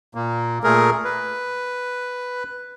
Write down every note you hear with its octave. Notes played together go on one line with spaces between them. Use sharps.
A#2 A#3
A#2 A3 G#4 A#4
B4